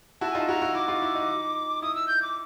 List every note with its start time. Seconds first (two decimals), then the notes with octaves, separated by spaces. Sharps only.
0.21 E4 F#4 A5
0.31 G#5
0.35 D#4 F4 A5
0.48 E4 F#4 A#5
0.62 E4 F#4
0.75 E4 D6
0.88 D#4 F4
1.02 E4
1.15 D#4
1.82 E4 D#6
1.95 E6
2.08 G6
2.22 D6